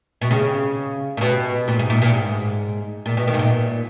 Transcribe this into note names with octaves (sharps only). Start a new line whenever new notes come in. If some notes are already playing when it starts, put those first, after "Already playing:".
B2
C#3
A#2
B2
A#2
G#2
A#2
A#2
G#2
A#2
B2
B2 D#3
G#2
A#2